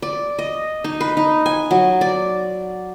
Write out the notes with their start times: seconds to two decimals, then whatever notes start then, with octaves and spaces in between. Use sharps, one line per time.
0.02 D5
0.39 D#5
0.84 D#4
1.01 B4
1.17 D#4
1.46 G#5
1.71 F#3
2.01 D5